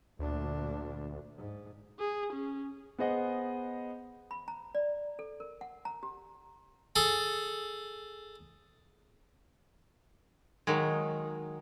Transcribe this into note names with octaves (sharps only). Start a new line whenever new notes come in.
D2 A#2 D4
G#2
G#4
C#4
B3 G#4 C5 D#5 F#5
B5
A#5
D5
A4
A#4
F#5
A#5
G4
G#4 A4
D#3 F#3 G#3